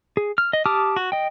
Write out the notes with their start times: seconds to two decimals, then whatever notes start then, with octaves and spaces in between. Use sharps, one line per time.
0.17 G#4
0.38 F6
0.53 D#5
0.66 G4 A5 D6 D#6 F6
0.96 F#4
1.12 D#5 G5